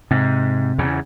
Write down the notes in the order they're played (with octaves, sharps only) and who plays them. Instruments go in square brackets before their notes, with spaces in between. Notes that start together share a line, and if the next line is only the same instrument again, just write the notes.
[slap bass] G#2 [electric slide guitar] C3
[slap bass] E2 C#3